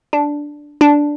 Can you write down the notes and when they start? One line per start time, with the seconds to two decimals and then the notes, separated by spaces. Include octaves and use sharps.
0.13 D4
0.81 D4